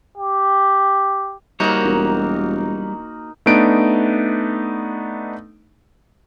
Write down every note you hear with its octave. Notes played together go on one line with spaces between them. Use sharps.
G4
G3 A#3 D#4 F#4 A#4 C#5
E1
A3 B3 D4 D#4 D7